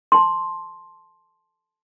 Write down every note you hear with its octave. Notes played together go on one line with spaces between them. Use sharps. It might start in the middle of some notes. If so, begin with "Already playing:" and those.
A5 C6